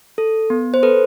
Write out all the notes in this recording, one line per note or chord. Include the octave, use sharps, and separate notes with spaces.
A4
B3
C5
A4 B4